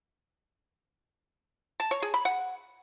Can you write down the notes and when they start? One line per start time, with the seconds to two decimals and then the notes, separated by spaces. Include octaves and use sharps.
1.80 A5
1.91 C#5
2.02 G#4
2.14 B5
2.25 F#5